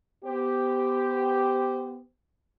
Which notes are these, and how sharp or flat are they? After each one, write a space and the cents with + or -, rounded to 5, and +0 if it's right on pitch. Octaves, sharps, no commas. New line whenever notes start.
B3 +10 G4 +0 C5 -20